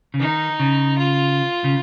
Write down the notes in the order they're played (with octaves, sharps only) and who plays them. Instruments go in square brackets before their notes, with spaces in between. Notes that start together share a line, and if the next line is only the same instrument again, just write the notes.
[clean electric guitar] C#3
[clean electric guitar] D#3 [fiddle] D#4
[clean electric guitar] C#3
[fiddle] F4
[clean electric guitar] C#3